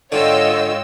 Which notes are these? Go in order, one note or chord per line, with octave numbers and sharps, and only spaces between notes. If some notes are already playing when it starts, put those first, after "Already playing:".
G#2 D3 F4 C#5 D#5 G5 E6